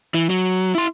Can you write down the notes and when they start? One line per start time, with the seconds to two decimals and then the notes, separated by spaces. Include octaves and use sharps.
0.14 E3
0.30 F#3
0.75 E4 C6